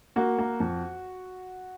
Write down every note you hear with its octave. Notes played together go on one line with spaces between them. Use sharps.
A#3 F#4
A#3
F2